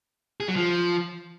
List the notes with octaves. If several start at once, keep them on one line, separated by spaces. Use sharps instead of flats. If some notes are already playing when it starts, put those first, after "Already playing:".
G#4
F#3
F3